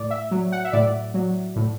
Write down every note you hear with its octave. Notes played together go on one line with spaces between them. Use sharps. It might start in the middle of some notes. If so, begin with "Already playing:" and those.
Already playing: A2 D5
E5
F#3
F#5
E5
A2 D5
F#3
A2